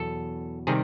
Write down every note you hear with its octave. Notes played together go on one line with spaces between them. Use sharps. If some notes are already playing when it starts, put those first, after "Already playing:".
Already playing: E2 B2 F#3 A4
C3 D#3 G3 G#4